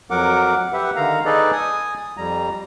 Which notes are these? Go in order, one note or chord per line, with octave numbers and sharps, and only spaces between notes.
F2 F#3 A#4 F#5 D6
G4 B4 E5 F#5
D3 D#3 F5 A#5
D#4 G#4 A4 B4 D5 D#5
G#5 D#6
F2 G3 A#5